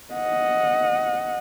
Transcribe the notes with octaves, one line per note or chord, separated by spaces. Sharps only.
D#5 F#5